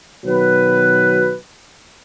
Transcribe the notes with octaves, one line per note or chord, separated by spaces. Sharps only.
B2 D#3 F#3 B4